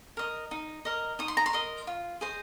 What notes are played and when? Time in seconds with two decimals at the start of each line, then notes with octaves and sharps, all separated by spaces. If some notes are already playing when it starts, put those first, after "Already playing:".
0.17 A#4 D#5
0.51 D#4
0.85 A#4 D#5
1.19 D#4 D#6
1.28 C6
1.37 A#5
1.46 C6
1.53 A#4 D#5
1.87 F4
2.21 G#4 C5 D#5